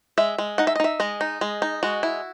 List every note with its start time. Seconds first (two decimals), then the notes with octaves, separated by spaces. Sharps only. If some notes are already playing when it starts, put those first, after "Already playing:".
0.18 G#3 E5
0.38 G#3
0.58 D#4 F#5
0.67 E5
0.76 D#5
0.80 D#4 E5
1.00 G#3 D#5
1.21 D#4
1.41 G#3
1.62 D#4
1.83 G#3 F#4
2.03 E4